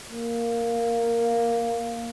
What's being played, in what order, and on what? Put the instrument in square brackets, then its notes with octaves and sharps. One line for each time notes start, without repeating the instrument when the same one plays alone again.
[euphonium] A#3